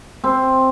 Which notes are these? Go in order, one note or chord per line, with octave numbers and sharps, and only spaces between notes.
C4